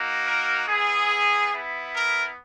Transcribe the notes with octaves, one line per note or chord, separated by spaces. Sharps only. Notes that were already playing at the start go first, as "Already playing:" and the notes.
Already playing: A#3 D#4 F#4
A#4
B3 E4 G#4
B3 E4
A#4